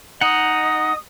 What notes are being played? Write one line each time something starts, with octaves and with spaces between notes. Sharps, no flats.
D#4 D#5 F#5 D#6